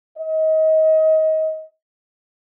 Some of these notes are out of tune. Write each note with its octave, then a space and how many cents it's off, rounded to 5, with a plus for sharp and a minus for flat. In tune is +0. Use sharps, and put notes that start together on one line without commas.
D#5 +25